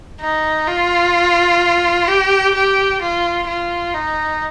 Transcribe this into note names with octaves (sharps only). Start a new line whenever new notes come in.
D#4
F4
G4
G4
F4
F4
D#4